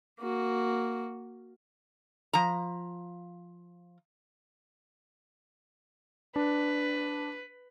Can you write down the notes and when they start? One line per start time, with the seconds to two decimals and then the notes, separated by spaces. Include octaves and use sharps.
0.20 A#3 F#4
2.33 F3 A#5
6.36 D4 B4